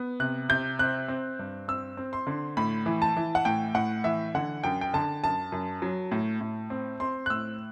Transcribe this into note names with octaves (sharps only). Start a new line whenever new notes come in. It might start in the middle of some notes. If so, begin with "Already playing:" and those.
Already playing: B3
C3 F#6
C3 G6
C4 F#6
C4
G2
C4 E6
C4
C6
D3
A2 B5
E3
A5
E3
F#5
A2 G5
A2 F#5
E3 E5
D3 F#5
F#2 G5
G5
D3 A5
F#2 A5
F#2
F#3
A2
A2
C4
C4 C6
F#6
A2 E6